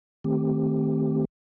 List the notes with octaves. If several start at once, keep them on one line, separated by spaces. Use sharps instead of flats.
D#3 A3 C4 G4